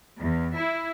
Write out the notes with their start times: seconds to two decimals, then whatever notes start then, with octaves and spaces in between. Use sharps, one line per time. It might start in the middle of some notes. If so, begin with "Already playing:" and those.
0.19 E2
0.57 E4